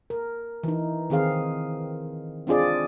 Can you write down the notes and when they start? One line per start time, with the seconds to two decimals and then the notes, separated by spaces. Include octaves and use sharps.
0.10 A#4
0.63 E3 D#4
1.10 D#3 C4 G#4 F5
2.47 C4 D4 F4 G#4 D5